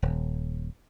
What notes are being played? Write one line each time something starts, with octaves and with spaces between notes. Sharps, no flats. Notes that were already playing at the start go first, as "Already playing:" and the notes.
D#1